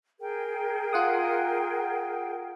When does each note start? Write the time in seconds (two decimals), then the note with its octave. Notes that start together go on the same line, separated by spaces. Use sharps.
0.20 G#4 A#4 G5
0.93 F4 F#5 D#6